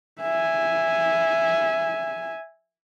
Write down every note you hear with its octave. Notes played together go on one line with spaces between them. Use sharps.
E5 G#5